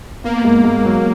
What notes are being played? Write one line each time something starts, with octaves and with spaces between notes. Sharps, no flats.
A#3 B3
G#2
G#2
F#3